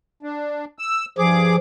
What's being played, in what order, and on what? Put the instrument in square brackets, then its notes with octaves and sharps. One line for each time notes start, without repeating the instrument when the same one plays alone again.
[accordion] D4
E6
[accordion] G2 G#4 D6 [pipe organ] F3